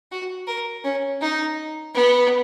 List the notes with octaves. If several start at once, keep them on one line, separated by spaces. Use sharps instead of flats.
F#4
A#4
C#4
D#4
B3